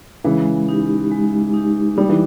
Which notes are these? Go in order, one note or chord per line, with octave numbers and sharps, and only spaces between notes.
C#3 E3 G#3
D#4 G4
G#3
D#4 G4
G3 D#4
E3